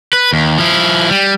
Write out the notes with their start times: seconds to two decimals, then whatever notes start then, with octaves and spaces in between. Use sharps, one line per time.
0.13 B4
0.33 D#2
0.58 F3 E4
1.09 G3